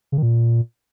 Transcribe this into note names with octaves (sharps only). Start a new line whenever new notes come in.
C#3
D#3
A#2